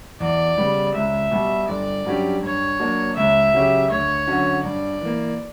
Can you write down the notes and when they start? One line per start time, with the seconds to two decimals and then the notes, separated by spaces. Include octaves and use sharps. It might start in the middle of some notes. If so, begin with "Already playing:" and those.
0.20 E2 D5
0.57 C#3 G3 B3
0.94 C#2 E5
1.31 B2 G3
1.68 G1 D5
2.05 G2 F#3 C#4 G4
2.42 G2 C#5
2.80 F#3 A#3 D4
3.16 C#2 E5
3.53 C#3 F#3 C#4 G4
3.90 D2 C#5
4.27 D3 F#3 C#4 F#4
4.64 G2 D5
5.01 E3 A#3